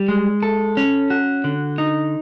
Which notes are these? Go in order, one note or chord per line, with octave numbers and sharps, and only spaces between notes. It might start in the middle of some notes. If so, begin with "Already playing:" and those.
Already playing: G3
G#3
A4
C#4
F#4
D3
D#4